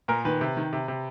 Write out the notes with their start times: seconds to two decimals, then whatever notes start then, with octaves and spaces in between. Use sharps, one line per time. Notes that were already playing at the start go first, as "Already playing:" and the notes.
0.08 A#2 A#4
0.25 D#3 B4
0.41 C3
0.57 D#3
0.73 C3
0.88 C3